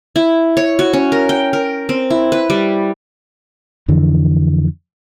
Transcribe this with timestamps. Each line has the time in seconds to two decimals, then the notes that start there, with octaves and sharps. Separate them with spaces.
0.16 E4
0.57 C#5
0.79 F#4
0.93 C#4
1.12 A#4
1.29 G5
1.53 A#4
1.89 C4
2.10 E4
2.32 B4
2.50 G3
3.88 F2 D3 E3